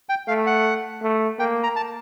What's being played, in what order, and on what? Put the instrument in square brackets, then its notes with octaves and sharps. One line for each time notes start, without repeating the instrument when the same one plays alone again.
[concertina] G5
[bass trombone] A3 [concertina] F5
[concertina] F#5
[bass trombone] A3
[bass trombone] A#3 [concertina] G5
[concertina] A#5
A5